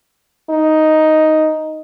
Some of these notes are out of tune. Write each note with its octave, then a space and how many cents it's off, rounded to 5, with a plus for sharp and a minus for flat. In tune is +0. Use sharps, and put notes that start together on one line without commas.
D#4 +5